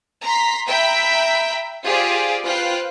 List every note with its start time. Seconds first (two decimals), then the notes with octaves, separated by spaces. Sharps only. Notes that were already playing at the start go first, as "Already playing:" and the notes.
0.24 A#5 C6 B6
0.68 E5 G5 A#5 B5 G6 B6
1.83 F4 G4 G#4 C5 D5
2.44 F4 B4 C5 F5 G5 F#6